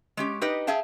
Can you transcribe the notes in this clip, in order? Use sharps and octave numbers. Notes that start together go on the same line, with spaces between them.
G#3 C#4 G4
D#4 G4 B4 D#5
G#4 E5 F5 G5 A5